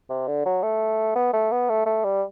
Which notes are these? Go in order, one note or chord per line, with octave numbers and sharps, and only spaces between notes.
C3
D3
F#3
A3
B3
A3
B3
A3
A3
G3